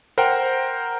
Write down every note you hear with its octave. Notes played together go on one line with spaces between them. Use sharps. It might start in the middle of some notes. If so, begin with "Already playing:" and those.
A#4 C5 F#5 G5 A#5